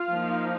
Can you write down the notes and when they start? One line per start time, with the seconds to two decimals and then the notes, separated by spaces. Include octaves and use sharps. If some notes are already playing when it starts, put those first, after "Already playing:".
Already playing: F4 F5
0.10 F3 A#3 D#4